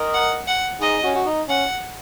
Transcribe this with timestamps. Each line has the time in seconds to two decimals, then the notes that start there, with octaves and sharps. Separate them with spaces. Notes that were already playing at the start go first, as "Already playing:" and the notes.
Already playing: A#4 D#5
0.14 F#5
0.47 F#5
0.81 D#4 G#4 D#5
1.04 C#4 F#4
1.15 F#4
1.26 D#4
1.49 C#4 F#5